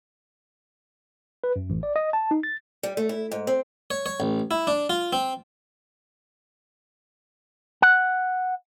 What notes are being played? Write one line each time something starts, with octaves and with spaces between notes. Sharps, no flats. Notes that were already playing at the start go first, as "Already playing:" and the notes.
B4
F#2
A1
D5
D#5
A5
D#4
A6
G3
A3
E4
G#2
C4
C#5
C#5
A1
E4
D4
F4
C4
F#5